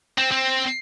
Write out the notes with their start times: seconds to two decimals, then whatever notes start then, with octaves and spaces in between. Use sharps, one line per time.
0.18 C4
0.31 C4